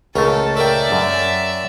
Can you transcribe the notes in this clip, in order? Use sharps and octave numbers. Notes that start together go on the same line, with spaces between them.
C#2 A3 C#4 A4 A#4
A4 A#4 D5 E5 G5
F#2